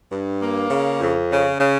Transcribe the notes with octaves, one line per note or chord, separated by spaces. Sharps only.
G2
A#3
C#3
F2
C#3
C#3